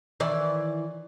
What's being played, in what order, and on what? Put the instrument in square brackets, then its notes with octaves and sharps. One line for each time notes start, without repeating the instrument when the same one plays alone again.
[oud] D#3 E3 D5